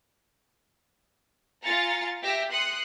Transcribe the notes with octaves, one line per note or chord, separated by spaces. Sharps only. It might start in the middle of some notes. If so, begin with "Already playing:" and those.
F4 G#5 A#5 A6 C#7
G4 E5 D6 E6 A#6
C6 D#6 F#6 C#7